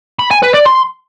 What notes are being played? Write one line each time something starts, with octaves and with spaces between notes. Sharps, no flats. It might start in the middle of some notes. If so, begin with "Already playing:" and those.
B5
G#5
B4
D5
C6